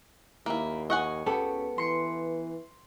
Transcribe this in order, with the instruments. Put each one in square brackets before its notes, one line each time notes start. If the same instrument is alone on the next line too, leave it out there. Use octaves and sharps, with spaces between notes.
[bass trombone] D#2 [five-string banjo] A#3 E4
[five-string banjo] D#5 F#5 G#5 [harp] C#6
[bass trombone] C#2 [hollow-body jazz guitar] B3 G4 A4
[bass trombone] E3 [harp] C6 C#7